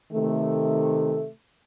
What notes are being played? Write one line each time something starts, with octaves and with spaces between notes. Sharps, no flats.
C3 D#3 A3